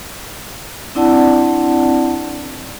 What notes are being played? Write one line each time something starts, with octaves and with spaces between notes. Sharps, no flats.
C4 D4 E4 D5 F#5 A5